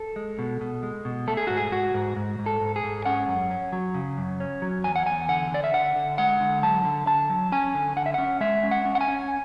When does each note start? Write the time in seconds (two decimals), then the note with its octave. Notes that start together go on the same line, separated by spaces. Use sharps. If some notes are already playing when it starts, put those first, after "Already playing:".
Already playing: A4
0.16 G#3
0.39 B2
0.61 B2
0.83 G#3
1.05 B2
1.28 A3 A4
1.37 G#4
1.47 G#2 F#4
1.57 G#4
1.72 G#2 F#4
1.94 G#2
2.16 G#2
2.39 G#2
2.46 A4
2.61 G#2
2.76 G#4
2.84 G#2
3.06 C#4 F#5
3.28 F#2
3.51 C#4
3.72 F#3
3.94 C#3
4.18 F#2
4.40 C#4
4.62 F#3
4.84 E2 G#5
4.96 F#5
5.06 E2 G#5
5.29 D3 F#5
5.51 D3 D5
5.64 E5
5.74 D3 F#5
5.96 D3
6.18 G#3 F#5
6.41 D3
6.63 F#3 A5
6.85 D3
7.07 D3 A5
7.30 F#3
7.52 C#4 G#5
7.75 D3
7.97 D3 F#5
8.06 E5
8.14 C#4 F#5
8.41 G#3 E5
8.63 C#4
8.71 F#5
8.85 C#4
8.95 F#5
9.01 G#5
9.08 C#4